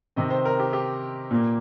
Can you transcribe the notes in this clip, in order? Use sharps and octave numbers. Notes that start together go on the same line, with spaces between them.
C3 D#3 C4 D#5
C5
A#4
G4
G4
A#2 A#3